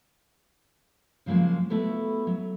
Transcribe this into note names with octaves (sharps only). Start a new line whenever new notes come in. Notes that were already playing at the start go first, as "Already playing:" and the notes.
C#3 F3 F#3 G#3 A#3
A3 B3 E4 F#4 A4
F#3